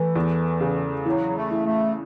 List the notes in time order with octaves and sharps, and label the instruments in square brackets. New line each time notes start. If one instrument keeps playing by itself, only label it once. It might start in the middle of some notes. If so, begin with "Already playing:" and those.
Already playing: [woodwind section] E3 [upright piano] A3
[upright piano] E2
C#3
[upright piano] E3 [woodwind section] F#3
[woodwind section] A3
[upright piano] E3
[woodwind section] A3